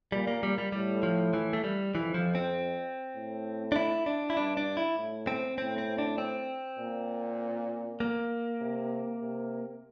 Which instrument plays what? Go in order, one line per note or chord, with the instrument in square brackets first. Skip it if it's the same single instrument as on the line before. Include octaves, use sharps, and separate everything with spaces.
[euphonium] A#2 [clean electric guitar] G3
[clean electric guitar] A#3
G3
G3
[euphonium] A2 [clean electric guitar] G3
[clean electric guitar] F3
E3
A3
G3
[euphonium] F2 [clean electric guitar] E3
[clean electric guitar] F3
C4
[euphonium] A2
[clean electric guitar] D4
E4
D4
E4
[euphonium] G2 [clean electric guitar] D4
[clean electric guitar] D4
E4
[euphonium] A2
[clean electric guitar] C4
[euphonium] A2 [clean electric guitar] C4
[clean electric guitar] C4
D4
C4
[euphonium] A#2
[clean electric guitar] A#3
[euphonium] C3
C3